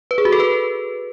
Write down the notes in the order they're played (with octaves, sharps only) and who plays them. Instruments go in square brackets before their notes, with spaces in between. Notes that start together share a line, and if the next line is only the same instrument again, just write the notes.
[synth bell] B4
G#4
F#4
A4
B4